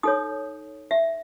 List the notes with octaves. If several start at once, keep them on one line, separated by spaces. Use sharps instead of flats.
D#4 A4 C#5 D#6
E5